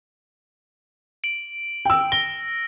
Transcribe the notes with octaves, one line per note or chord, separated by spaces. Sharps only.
D7 F#7
G5 E6
A#6 G7